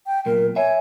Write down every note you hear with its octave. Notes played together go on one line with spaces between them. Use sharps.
G5
B1 A#2 A#4
C#5 E5 G#5